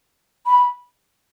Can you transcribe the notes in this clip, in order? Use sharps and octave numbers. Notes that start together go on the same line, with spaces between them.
B5